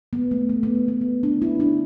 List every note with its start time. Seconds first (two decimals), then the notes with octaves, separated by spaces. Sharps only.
0.13 B3
0.31 A3
0.49 A3
0.63 B3
0.75 A3
0.88 B3
1.01 A3
1.23 D4
1.42 E4
1.60 D4